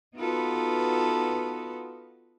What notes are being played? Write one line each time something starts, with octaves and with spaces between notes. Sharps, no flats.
B3 D#4 F4 F#4 A4 B4